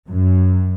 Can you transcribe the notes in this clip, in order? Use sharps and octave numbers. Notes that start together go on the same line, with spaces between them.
F#2